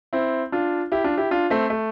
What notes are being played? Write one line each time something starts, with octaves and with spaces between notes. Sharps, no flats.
C4 E4
D4 F4
E4 G4
D4 F4
E4 G4
D4 F4
A3 C4
A3